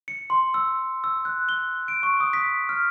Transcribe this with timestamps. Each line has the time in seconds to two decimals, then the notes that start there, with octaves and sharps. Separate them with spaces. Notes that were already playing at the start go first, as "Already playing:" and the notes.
0.08 C#7
0.30 C6
0.54 E6
1.04 E6
1.25 F#6
1.49 G7
1.88 D7
2.03 C#6
2.20 D#6
2.33 B6
2.69 F6